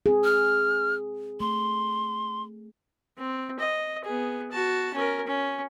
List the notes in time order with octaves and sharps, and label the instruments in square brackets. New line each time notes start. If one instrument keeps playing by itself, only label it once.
[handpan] C4 G#4
[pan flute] F6
[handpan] A3 [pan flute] C6
[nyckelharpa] C4
D#5
B3 G#4
F#4 A5
C#4 A#4
C#4